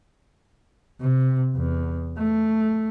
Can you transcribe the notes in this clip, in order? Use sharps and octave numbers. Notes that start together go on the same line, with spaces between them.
C3
E2
A3